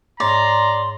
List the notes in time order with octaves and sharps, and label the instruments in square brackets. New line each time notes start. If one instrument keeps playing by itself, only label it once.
[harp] G#2 C#5 C7 [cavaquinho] D5 [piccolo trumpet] A#5 [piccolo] C6